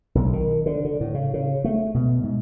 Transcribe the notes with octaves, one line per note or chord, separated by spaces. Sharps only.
B1
D#3
D3
D3
A2
C#3
C#3
A3
B2
G#2